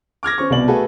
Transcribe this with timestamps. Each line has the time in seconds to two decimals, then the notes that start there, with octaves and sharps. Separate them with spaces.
0.23 D6 F6 G#6 A#6
0.38 C#4 C5 C#6
0.50 C2 B2 D5 F#7
0.68 A3 F#4 G#4 A4 B4